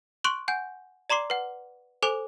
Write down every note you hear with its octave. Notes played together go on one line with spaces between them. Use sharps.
C6 C#6 F#6 D7 F#7
F#5 G#5 G6
D5 A#5 C6 D6 C7
B4 F#5
A4 C5 G#5 D6 F7